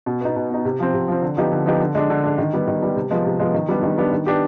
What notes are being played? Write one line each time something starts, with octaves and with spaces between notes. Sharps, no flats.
B2
B3 D#4
B2
B3 D#4
C3
F3 C4
C3
F3 C4
D3
F3 B3 D#4 G4
D3
F3 B3 D#4 G4
D3
G#3 D4
D3
G#3 D4
D#3
G3 B3
D#3
G3 B3
C3
F3 G#3 B3
C3
F3 G#3 B3
D#3
G3 B3 D4
D#3
G3 B3 D4
D#3
B3 D4 G4